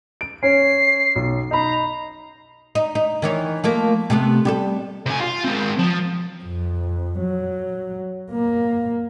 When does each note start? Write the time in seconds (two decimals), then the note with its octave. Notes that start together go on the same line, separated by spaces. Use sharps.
0.21 D7
0.43 C#4 C#5 C7
1.16 B1
1.51 D#4 A#5 B5
2.75 D#4
2.95 D#4
3.22 D#3 E3 C#5
3.64 F3 A3 A#3
4.10 C3 A3 B3
4.45 G3 G4 A4
5.06 C3 G#5
5.20 F4 F5
5.44 G#3 C4
5.79 F3
6.44 F2
7.19 F#3
8.31 A#3